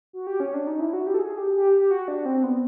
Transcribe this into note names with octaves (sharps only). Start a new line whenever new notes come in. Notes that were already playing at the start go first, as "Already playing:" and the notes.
F#4
G4
C#4
D4
D#4
E4
F#4
G4
A4
G#4
G4
G4
G4
F#4
D4
C4
B3